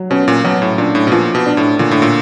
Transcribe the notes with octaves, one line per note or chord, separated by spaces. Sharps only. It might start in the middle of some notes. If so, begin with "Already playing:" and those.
Already playing: F#3
B2 C#4
A#2
B2 F#3
A2
A#2 D4
A2
B2
A#2 F3
B2
D4
A2
A#2 D3
A2
A#2